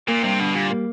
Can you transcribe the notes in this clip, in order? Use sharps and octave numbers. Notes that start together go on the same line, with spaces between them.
A#2 A#3
G2 C3
B2 D3
A#2 G3
A#3